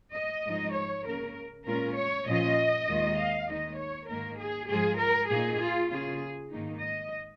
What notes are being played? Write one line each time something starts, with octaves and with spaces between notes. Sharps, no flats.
D#5
G#2 F3 G#3 D#4
C#5
C#3 A#3 C#4 A#4
A#2 G#3 C#4 F4 A#4
C#5
A#2 F3 C#4 F4 D#5
D#2 D#3 G#3 F4
F5
D#2 D#3 G#3 D#4 D#5
C#5
G#2 D#3 A#3 A#4
G#4
G#2 F3 G#3 F4 G#4
A#4
A#2 A#3 D#4 G#4
F4
C#3 A#3 F4 G#4
G#2 D#3 A#3 D#4
D#5